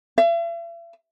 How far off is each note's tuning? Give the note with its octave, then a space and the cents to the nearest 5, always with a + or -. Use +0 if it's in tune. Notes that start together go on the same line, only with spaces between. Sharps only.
E5 +45